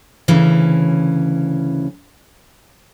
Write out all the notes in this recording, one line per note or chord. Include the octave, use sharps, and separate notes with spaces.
D2 C#3 E3 C#4